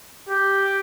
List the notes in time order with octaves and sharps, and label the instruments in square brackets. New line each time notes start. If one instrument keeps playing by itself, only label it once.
[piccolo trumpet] G4